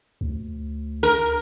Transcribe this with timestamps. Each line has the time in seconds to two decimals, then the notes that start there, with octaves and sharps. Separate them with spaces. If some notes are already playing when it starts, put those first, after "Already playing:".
0.21 D2
1.03 A#4